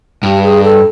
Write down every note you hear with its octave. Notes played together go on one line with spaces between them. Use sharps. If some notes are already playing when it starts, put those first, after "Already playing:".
G2 G4
G#4
A4